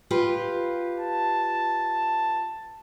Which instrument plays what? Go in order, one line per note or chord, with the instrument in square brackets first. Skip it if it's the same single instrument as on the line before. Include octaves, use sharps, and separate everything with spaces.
[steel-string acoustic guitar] F4 G4 B4
[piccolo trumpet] A5